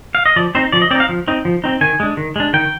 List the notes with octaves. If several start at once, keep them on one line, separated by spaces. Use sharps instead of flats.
F5
D#5
F3 D5
C4 D#4 C5
F3 D5
D#5
C4 D#4 D5 F5
F3
C4 D#4
F3
C4 D#4
D#3 G#5
G#3 D4
D#3
G#3 D4
D#3 G5